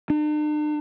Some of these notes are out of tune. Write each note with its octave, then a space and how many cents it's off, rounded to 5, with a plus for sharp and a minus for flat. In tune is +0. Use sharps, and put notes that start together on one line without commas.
D4 +45